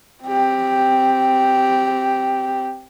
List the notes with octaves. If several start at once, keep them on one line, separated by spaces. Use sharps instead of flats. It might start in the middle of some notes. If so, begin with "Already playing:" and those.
C4 G4